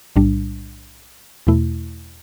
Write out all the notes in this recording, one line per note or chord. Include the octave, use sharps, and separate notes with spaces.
B1 A2 G3 D4
E2 B2 A3 E4